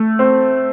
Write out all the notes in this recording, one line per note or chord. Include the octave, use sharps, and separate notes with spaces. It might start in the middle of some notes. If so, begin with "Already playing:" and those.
Already playing: A3
C4